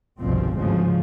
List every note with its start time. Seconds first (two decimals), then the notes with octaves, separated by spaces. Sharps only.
0.20 G1 C2 G2 B2 F3 C4
0.58 D2 G#2 C#3 F3